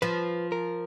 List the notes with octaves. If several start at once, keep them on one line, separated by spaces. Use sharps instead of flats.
F3 B4
A#4